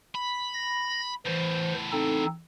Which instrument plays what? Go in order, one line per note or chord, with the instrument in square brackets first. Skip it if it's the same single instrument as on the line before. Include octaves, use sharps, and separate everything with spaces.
[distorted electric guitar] B5
[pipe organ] A#6
[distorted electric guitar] E2 A2 [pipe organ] E3 C5
[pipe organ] C4 D#4 A4